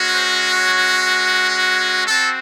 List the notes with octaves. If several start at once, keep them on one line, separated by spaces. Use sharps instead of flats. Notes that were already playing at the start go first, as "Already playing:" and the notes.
Already playing: G#3 C#4 F#4
C5
C#5
C4 F#4 A4